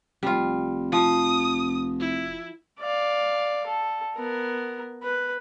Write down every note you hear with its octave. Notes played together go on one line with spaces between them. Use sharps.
F1 G3 F4
F3 D#6
E4
D5 F5
A4
B3 A#4
B4